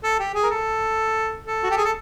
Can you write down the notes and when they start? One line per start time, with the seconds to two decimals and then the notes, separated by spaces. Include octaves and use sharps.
0.03 A4
0.19 G4
0.34 G#4
0.43 A#4
0.50 A4
1.44 A4
1.63 F#4
1.70 G4
1.77 G#4
1.84 A4